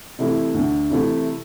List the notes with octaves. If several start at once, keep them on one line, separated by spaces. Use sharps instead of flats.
C3 E3 A3 E4
D2
C3 E3 A3 E4